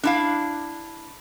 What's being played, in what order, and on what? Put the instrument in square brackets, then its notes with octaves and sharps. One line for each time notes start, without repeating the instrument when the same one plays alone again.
[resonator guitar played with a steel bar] D4 E4 F5